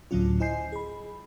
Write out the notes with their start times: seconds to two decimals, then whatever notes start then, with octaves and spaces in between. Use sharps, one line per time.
0.11 D2 A2 D3 F#3 C#4 F4
0.40 E4 C5 D#5 G#5 G6 C7
0.72 G#4 B5